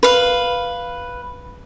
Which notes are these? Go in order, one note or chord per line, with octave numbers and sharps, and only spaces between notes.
B4 F5